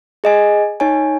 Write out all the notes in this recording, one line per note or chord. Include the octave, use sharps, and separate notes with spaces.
G#4 D#5 G#5
D#4 C#5 G#5